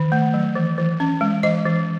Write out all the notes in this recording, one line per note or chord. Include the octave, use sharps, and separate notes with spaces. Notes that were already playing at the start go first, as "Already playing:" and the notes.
Already playing: D#3
A3
F#3
E3
E3
C#4
G#3
E3 D#5
E3